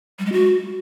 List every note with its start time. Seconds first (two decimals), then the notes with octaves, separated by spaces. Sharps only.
0.19 G3
0.26 G#3
0.32 F#4